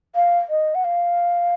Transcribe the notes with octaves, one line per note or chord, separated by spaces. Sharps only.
F5
D#5
F#5
F5